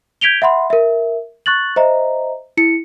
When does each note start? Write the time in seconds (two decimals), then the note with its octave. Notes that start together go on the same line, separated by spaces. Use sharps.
0.21 G6 G#6 B6 D7 F7 G7
0.42 E5 F#5 B5 C6
0.70 A#4 E5
1.46 C#6 F#6 A6 F#7
1.76 C5 D#5 E5 A#5
2.57 E4 C#7